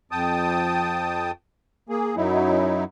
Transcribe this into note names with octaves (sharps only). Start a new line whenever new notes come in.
F2 G5 A5 D#6
A#3 G#4
F#2 F#3 D#4 E4